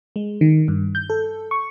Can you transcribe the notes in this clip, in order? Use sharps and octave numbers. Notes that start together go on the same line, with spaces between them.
G#3
D#3
G2
G6
A4
C#6